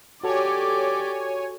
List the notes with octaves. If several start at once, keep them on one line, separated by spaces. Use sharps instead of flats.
F#4 G4 A4 C#5 D5 G#5